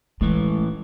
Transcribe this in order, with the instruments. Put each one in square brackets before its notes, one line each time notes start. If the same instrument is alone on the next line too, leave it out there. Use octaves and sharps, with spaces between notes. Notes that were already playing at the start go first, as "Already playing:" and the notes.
[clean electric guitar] A2 E3 [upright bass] G#3